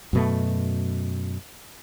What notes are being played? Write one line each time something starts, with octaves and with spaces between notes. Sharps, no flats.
F#2 B2 A3